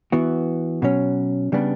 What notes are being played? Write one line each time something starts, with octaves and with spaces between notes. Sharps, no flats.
E3 B3 F#4
B2 F#3 C#4
C#3 G3 B3 D4